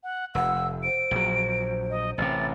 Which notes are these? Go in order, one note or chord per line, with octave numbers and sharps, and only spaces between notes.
F#5
F1 F#5 E6
C5 D7
A#1 F#3
D#5
A1 C3 A6